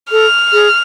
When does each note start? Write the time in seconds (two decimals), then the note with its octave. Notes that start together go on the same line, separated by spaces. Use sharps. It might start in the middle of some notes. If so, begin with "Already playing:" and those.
0.11 A4 F6
0.53 G#4